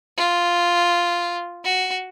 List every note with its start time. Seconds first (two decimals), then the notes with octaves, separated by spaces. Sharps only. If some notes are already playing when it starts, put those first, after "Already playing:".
0.17 F4
1.65 F#4